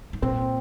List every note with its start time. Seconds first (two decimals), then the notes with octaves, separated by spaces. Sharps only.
0.13 G#2
0.22 A#2 C4